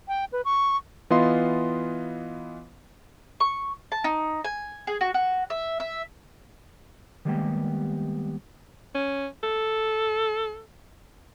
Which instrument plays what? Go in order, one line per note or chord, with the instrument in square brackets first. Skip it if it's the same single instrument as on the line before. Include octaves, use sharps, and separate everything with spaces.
[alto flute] G5
B4
C#6
[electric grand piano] E3 B3 F4 D#5 F5 C6
[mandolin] C#6
A5
D#4
G#5
G#4
F#4
F#4
E5
E5
[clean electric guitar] D#3 G3 G#3 A#3 B3 G4
[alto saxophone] C#4
A4